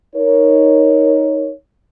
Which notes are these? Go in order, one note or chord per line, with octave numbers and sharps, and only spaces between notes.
D#4 A#4 C#5